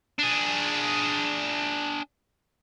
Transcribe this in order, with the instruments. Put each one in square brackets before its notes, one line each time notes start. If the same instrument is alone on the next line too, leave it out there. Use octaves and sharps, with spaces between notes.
[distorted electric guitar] D4 G#4